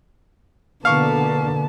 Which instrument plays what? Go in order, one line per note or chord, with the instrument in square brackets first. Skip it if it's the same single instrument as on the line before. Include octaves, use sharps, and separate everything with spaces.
[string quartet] B2 B3 [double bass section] D3 [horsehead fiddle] A#3 A5 [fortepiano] F5 C#6